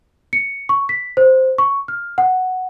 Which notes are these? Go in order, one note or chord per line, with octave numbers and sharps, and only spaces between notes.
C#7
C#6
B6
C5
C#6
F6
F#5